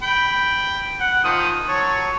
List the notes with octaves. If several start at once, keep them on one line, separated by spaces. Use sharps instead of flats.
G5 B5
F#5
D#3 F3 D#6
F#3 C#5 A5